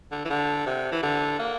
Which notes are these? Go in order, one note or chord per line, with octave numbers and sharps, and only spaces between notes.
D3
E3
D3
C3
E3
D3
A#3